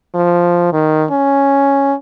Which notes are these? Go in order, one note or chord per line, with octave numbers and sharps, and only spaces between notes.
F3
D#3
C#4